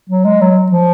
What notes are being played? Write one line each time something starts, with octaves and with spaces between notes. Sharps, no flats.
F#3
G#3
F#3
F3